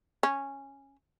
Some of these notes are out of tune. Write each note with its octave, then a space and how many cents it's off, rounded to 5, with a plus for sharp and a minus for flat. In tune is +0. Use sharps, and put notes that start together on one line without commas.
C#4 -10